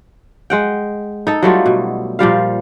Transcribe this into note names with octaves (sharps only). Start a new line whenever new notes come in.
G#3 F#5 G5
D#4 A4
F#3 G3 A3 F4
B2
A#2 F3 G3 F5